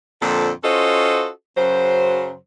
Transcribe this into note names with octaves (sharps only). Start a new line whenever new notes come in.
F2 A#2 D3 F3 A4
C#4 F4 F#4 A4 C5 D#5
F#2 C#3 F#3 C5